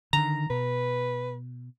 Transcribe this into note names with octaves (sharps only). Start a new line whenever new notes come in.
D3 D#3 A#5
B2 B4